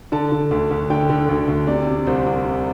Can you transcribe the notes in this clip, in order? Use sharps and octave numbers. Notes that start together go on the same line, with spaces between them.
D3 A5
D3
D2
D2
D3 G5
D3
D2
D2
C3 D5
C3
C2 C5
C2
C3